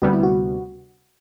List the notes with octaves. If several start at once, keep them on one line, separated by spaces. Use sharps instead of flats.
D2 C3 G3 B3 F#4
E4
F#4